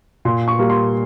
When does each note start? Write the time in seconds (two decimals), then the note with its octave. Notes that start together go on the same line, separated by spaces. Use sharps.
0.25 A#2 C6
0.48 C#6
0.59 G3 A#3
0.70 C6